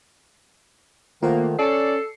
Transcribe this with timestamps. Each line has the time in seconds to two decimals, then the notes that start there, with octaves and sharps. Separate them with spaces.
1.22 D#3 A3 A#3 F4 C5 F#5
1.59 C#4 A4 D5 C7 C#7